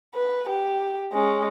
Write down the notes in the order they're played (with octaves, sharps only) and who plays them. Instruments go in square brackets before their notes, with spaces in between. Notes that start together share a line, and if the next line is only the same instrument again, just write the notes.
[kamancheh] B4
G4
G#3 C#4